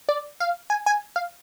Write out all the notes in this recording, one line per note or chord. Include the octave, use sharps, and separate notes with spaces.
D5
F5
G#5
G#5
F5